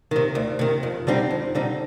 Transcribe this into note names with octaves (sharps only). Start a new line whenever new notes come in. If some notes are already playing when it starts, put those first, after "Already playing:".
C3 D#3
D2
C3 D#3
F2
D3 G3 C4 D#4
F2
D3 G3 C4 D#4